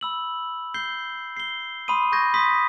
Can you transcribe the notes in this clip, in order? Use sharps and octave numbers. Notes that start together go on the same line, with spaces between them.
B5 E6 F#7
G6 C7 G7
C7 G7
B5 C6 D#6 D#7
B5 C#6 G6 G#6 A#6
C6 D#6 B6